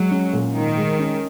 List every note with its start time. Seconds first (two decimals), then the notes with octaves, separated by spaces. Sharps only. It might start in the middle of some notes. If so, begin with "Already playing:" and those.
Already playing: F#3 G#3
0.11 C#4
0.33 A#2
0.55 G#2 D#3
0.77 G#3
0.99 C#4